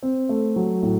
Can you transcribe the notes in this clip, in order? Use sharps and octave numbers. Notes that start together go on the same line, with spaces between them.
C4
A3
F#3
A2